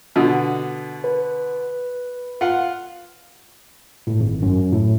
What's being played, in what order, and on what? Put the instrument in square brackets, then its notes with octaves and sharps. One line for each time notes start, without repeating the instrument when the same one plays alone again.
[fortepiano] B2 D3
[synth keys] B4
[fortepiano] F4 F#5
[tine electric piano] A2
G#1
F#2
A2